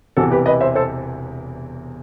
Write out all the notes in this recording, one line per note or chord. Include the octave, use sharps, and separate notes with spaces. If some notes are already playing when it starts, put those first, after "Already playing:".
E1 E2 C3 E3 F#4 A4
G4 B4
B4 D#5
C5 E5
A4 C5